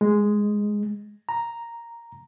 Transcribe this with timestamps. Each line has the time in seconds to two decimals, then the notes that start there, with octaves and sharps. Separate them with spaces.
0.01 G#3
1.29 A#5